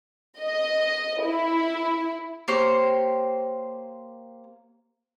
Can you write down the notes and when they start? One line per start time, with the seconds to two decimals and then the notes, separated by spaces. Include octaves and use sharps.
0.41 D#5
1.24 E4
2.48 A#3 G4 C5 C#5